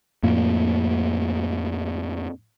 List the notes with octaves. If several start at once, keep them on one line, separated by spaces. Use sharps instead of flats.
F2 A2 A#3